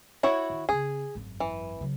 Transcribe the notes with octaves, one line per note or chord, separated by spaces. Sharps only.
E4 F#4 C#5
D#3
C#3 C4 G#4
G#1 F#2
E3
C#3 F#3